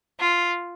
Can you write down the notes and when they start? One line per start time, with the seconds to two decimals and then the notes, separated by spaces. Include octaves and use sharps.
0.20 F4